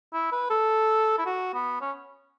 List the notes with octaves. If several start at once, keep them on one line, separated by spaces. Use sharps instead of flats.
E4
B4
A4
E4
F#4
B3
C#4